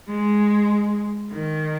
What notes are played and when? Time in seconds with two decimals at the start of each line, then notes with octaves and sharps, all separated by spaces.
0.09 G#3
1.32 D#3